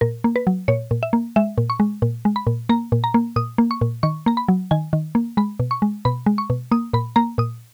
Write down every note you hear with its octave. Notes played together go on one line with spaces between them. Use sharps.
A#2 A#4
A#3
B4
F#3
A#2 C#5
A#2
E5
A#3
G#3 E5
A#2
C#6
G#3
A#2
G#3
B5
A#2
A#3 A#5
A#2
A#5
A#3
A#2 D#6
A#3
C#6
A#2
D#3 C#6
A#3 A#5
B5
F#3
D#3 G#5
D#3
A#3
G#3 B5
B2
C#6
G#3
B2 B5
G#3
C#6
B2
A#3 D#6
A#2 B5
A#3 A#5
A#2 D#6